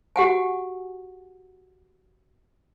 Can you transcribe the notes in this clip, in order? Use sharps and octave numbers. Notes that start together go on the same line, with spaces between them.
F#4 G4 F#5 G#5